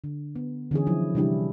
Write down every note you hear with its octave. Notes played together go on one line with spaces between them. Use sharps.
D3
B3
D3 E3 C#4 G#4
F3 F#3 E4
C3 E3 G3 D4 E4 G4